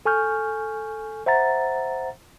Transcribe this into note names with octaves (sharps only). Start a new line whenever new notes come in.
A4 G#5 C#6 F6 G6
C5 E5 F#5 A#5 A6